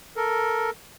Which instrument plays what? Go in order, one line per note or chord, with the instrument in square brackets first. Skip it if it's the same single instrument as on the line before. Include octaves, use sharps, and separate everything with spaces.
[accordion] A4 A#4